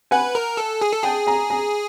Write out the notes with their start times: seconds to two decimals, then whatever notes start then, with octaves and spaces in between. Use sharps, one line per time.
0.11 B4 F#5 G#5
0.35 A#4
0.57 A4
0.82 G#4
0.92 A4
1.04 G#4 G5 A5
1.27 G#5 A#5
1.50 G#5 A#5